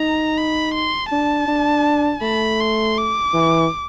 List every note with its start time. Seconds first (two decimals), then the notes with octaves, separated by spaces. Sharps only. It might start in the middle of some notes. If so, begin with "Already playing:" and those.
Already playing: D#4 A#5
0.38 B5
0.75 C6
1.11 D4 A5
1.48 D4
2.22 A3 B5
2.60 C6
2.97 D6
3.34 E3